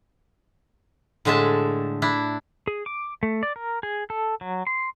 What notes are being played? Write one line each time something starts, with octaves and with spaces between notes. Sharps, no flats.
A2 D3 G#3 E5 A5
D4 E4
G#4
D6
A3
D5
A#4
G#4
A4
F#3
C6